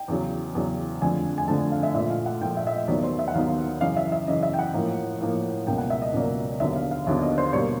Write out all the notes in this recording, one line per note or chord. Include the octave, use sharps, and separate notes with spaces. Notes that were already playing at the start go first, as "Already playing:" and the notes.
Already playing: G5
E2 C#3 F#3
E2 C#3 F#3
F2 D3 F3 A3 G#5
G#5
F2 D3 F3 A3 A5
F5
E5
A#2 F3 A3 E5
F5
F#5
A#2 F3 A3 G5
E5
E5
D#5
D#2 D#3 F#3 B3 D5
C5
E5
F#5
D#2 D#3 F#3 B3 F5
F#2 C#3 E3 F5
E5
E5
F#2 C#3 E3 D#5
E5
G5
F#5
A2 F3 A#3
A2 F3 A#3
C#2 B2 F#3 A#3 G5
F#5
E5
D#5
C#2 B2 F#3 A#3 D5
D#2 D3 F#3 B3 E5
F5
F5
D#2 D3 F#3 B3 E5
D#5
C5
B2 G3 A#3 C#5